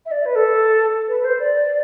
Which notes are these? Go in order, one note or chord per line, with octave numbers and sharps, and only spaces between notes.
E5
D5
B4
A4
B4
B4
C5
D5